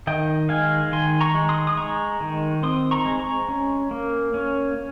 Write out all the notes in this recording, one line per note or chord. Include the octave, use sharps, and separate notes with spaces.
D#3 D#5 G5
G#3 F5 G#5
D#3 G#5 C6
A#5 C#6
G#3
C6 D#6
D#6
G#3 A#5 C#6
D#3
C4 C6 D#6
A#5 C#6
G#3
A#5 C#6
C#4
A#3
C#4